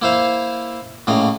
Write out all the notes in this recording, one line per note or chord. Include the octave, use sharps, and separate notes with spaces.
A#3 E4 C5 F5
A2 C#3 A#3 D#5